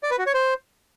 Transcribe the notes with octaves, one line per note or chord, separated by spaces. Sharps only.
D5
B4
F#4
C#5
C5